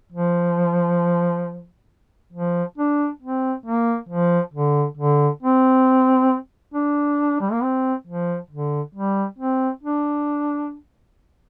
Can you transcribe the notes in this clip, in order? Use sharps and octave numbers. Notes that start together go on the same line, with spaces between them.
F3
F3
D4
C4
A#3
F3
D3
D3
C4
D4
G3
A#3
C4
F3
D3
G3
C4
D4